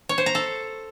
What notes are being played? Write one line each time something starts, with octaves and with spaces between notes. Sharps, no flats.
C#5
C5
A#5
A4